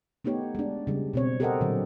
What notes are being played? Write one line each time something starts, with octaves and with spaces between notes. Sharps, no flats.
A3 B3 D#4 G4 C#5
G#3 D4
C#3 G3
B2 C4 C#5
G4 A4 A#4 C5 D#5 F#5
A#2 D3 F#3